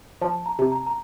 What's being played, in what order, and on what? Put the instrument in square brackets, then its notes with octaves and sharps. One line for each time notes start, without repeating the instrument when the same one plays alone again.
[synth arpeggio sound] F3 [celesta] A5
[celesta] A#5
[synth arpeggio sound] C3
[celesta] A#5
A#5